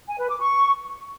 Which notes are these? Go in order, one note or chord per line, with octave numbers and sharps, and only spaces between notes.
G#5
B4
D6
C#6